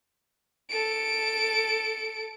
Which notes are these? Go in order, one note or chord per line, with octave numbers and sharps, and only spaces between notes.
A4 D7